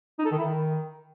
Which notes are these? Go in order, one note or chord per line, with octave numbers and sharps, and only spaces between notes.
D#4
A4
D#3
E4
D#3